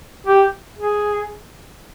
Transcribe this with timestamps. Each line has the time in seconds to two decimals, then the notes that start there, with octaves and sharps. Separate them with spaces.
0.26 G4
0.78 G#4